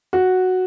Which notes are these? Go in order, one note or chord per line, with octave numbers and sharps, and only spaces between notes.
F#4